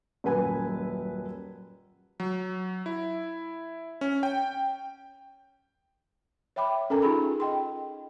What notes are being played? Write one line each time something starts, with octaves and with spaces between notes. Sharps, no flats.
D#1 F#2 B4 G#5
F#3
E4
C#4
G5
C#5 E5 G5 B5 D6
C#4 A4 A#4 G#5 A#5
D#4 F4 G#4 B5
D#5 G5 C6